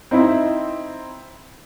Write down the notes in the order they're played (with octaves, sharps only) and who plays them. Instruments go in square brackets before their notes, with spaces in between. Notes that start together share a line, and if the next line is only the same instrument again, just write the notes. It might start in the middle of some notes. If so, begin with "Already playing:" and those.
[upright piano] C4 D#4 E4